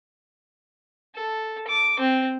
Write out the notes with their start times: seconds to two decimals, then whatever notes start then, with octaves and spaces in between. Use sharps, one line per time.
1.15 A4
1.67 D6
1.99 C4